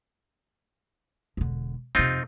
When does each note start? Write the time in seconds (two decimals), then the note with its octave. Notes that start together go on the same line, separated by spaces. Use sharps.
1.37 E1 D3
1.95 F2 C3 C4 D#4 F4